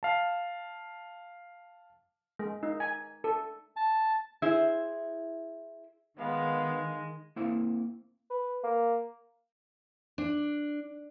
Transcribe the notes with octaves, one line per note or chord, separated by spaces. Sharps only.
F5 A5
G#3
D#4
G#5
A4
A5
E4 G#4 C5 E5
D#3 G#3 B3 F5
A#3 C4 E4 F5
B4
A#3
D4